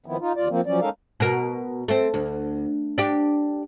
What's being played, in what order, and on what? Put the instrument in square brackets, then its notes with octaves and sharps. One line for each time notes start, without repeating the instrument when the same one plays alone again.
[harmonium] D#3 F3 B3 C4 E4
D#4 F4
D#2 F4 D5
F3 A#3 C4
F3 F#3 C#4 D5
G#3 C#4 D#4 A4 A#4 F5
[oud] B2 A#4
A3 C4
D2
D4 G4